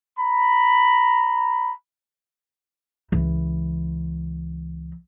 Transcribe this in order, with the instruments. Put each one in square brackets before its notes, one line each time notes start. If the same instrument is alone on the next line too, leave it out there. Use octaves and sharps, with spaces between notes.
[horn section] A#5 B5
[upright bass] C#2 E3